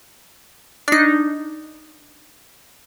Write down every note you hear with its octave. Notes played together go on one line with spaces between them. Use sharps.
D4 D#4